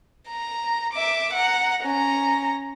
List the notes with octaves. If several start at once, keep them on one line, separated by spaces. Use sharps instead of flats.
A#5
E5 D6
F#5 A#5
C#4 A#5